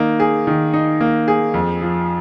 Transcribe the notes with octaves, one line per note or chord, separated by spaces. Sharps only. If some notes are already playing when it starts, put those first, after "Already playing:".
Already playing: D#3 A#3 D#4
G#4
D#3
D#4
A#3
G#4
F2
F3